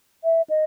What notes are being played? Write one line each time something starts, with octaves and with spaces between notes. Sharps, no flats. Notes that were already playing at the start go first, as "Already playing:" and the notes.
E5
D#5